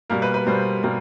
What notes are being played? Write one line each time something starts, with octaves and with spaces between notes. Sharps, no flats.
B2 G3 A#3 A#4
B4
B4
B2 G3 A#3 C5
B2 G3 A#3